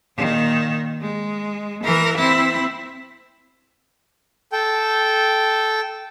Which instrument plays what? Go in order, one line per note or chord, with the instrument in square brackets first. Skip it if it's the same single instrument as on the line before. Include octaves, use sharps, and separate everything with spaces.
[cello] A#2 D#3
G#3
E3 A#4
C4 E4
[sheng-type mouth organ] A4 G5